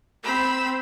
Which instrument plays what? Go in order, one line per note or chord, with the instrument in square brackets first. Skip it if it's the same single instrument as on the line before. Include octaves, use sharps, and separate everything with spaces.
[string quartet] C4 B5 E6